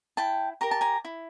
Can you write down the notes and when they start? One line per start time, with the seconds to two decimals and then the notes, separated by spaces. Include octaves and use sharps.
0.17 E4 G5 A5
0.61 G4 A#4 A#5
0.71 A5
0.81 G#5 A#5
1.05 E4